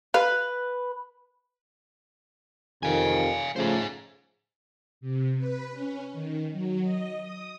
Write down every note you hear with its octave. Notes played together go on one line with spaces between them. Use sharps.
B4 F5
F2 C3 D#3 F5 G#5
C#3 F3 A3 G#4 C5
C3
B4
C#4
D#3
F#3
D#5
D#6